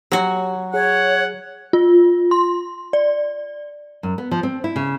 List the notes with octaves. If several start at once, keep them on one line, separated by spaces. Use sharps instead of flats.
F#3 F#4 G4
G#4 C#5 F#5
F4
C6
D5
F#2
B3
F3
C4
E4
C#3